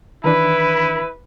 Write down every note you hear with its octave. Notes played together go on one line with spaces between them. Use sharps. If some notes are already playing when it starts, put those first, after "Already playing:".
D#3 E3 D4 E4 B4